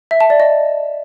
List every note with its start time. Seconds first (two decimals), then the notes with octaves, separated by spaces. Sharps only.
0.11 E5
0.21 A5
0.30 D5
0.40 D#5